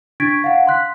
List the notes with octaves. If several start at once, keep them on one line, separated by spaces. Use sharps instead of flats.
D4 C#6 G#6 A6 B6 D7
F5 F#5
C6 F#6 B6